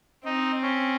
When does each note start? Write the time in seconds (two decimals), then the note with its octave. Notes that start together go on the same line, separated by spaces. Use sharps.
0.25 C4 D#4
0.62 C#4